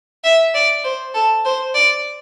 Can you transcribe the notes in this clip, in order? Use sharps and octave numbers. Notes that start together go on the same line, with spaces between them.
E5
D5
C5
A4
C5
D5